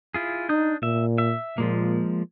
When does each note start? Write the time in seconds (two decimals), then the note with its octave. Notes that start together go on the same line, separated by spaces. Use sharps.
0.14 E4 F4 G#4
0.49 D4 D#4 D#6 G6
0.83 A#2 E5
1.18 E5
1.58 A#2 F3 G#3 A#3